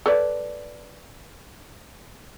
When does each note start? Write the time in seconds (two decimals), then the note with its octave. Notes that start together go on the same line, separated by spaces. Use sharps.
0.06 A4 B4 D5